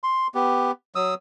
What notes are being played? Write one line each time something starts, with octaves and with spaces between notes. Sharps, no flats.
C6
B3 G4
F#3 D#6 E6